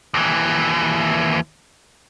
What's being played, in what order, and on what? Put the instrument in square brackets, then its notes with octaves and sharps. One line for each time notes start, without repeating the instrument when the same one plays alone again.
[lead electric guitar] D#2 E3